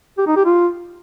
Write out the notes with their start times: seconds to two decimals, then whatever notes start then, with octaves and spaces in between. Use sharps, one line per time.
0.18 G4
0.27 D#4
0.36 G4
0.45 F4